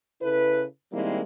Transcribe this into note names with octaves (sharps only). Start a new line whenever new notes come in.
C#3 E4 A4 B4
D#3 G3 G#3 A#3 C4 E4